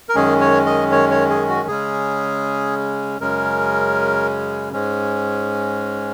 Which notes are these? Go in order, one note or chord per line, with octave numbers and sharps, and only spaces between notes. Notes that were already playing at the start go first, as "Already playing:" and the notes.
A#4
F#2 D#3 G#3 C#4 G#4
C#5
D#5
C#5
C#5
G#4
F#4
C#3 G#3 C#4 G#4
F#2 C#3 G#3 C#4 A#4
G#2 G#3 C#4